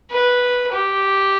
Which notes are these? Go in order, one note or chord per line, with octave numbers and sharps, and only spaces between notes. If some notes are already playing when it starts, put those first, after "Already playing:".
B4
G4